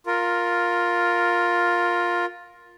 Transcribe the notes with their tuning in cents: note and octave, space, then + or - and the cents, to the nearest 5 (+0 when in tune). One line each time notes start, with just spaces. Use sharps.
F4 +10 A#4 +0